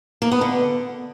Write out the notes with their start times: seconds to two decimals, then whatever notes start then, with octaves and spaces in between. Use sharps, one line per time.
0.22 A#3
0.31 B3
0.41 D3